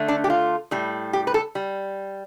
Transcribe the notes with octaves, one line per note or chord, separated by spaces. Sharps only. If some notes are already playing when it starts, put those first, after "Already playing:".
Already playing: D3 A3
D4
G4
F4
A2 G3
G4
B4
A4
G3